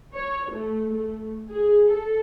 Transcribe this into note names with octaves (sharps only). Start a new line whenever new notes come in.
C#5
A3
A3
G#4
A4